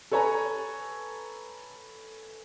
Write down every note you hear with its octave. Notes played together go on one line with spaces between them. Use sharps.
A4 B4 C#5 G#5 A#5